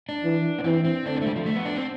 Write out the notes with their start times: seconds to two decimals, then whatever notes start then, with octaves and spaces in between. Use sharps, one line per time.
0.09 D4
0.24 E3
0.58 B3
0.64 E3 C4
0.85 C4
1.05 D3 D4
1.15 C4
1.22 A3
1.26 G3
1.36 F3
1.46 A3
1.56 B3
1.66 D4
1.76 C4